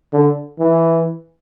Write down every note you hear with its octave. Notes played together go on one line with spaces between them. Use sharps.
D3
E3